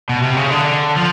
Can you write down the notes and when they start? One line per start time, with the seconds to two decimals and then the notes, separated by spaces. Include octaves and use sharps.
0.09 B2
0.22 C3
0.36 C#3
0.50 D3
0.96 F3